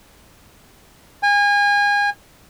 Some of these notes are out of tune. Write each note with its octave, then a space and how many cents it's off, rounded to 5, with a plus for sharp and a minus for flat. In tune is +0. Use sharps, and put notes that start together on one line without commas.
G#5 -30